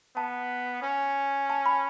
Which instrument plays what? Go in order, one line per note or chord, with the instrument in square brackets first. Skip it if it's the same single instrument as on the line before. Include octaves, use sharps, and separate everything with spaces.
[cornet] B3 [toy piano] A5
[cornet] C#4
[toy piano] A5
B5